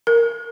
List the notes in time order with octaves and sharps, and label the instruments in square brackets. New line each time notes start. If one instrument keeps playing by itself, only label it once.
[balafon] A#4